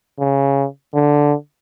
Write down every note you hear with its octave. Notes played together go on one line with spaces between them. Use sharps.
C#3
D3